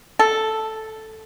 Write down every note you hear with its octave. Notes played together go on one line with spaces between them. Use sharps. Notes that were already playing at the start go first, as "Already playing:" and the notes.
A4